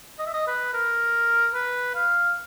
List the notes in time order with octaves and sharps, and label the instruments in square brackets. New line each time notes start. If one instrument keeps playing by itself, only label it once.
[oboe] D#5
E5
D#5
B4
A#4
B4
F5